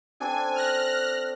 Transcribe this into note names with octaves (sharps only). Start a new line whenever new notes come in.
C4 D4 A4 G#5
F6 F#6 A#6